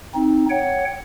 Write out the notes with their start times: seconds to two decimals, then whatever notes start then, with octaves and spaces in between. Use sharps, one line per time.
0.14 C4 D#4
0.50 C#5 F#5 G5